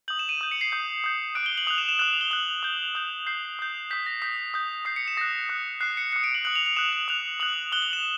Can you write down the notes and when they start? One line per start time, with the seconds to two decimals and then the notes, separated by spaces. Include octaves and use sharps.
0.08 D#6 G6 F#7
0.19 E7
0.29 D#7
0.41 D#6 G6
0.51 C#7
0.61 C7
0.72 D#6 G6
1.04 D#6 G6
1.35 D#6 F#6 D7
1.46 G7
1.58 F#7
1.67 D#6 F#6 F7
1.78 E7
1.89 E7
1.99 D#6 F#6 E7
2.10 F7
2.21 G7
2.31 D#6 F#6 F#7
2.63 D#6 G6
2.95 D#6 G6
3.26 D#6 G6 C7
3.59 D#6 G6
3.90 D#6 G6 B6
4.06 A#6
4.22 D#6 G6 B6
4.54 D#6 G6
4.85 D#6 G6 C7
4.96 C#7
5.08 E7
5.17 D#6 F#6 A#6
5.49 D#6 F#6
5.81 D#6 F#6 C7
5.97 C#7
6.12 D#6 F#6 C#7
6.24 D7
6.35 F#7
6.45 D#6 F#6 F#7
6.55 F7
6.66 F7
6.76 D#6 F#6 E7
6.93 F#7
7.08 D#6 F#6 F7
7.40 D#6 F#6 F#7
7.72 D#6 F#6 G7
7.82 F#7
7.93 E7